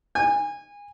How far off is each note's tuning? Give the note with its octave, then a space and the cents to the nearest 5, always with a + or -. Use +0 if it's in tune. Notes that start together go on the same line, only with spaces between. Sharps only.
G#5 -25